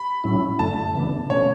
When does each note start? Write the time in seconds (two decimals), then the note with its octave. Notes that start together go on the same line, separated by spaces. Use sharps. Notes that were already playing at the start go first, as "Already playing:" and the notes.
Already playing: B5
0.24 A2 F#3 C#4 E4
0.59 F#2 D3 A3 A5
0.95 C#3 E3 B3 D4
1.30 B2 A3 C#4 C#5